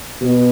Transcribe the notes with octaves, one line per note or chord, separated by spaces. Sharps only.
B2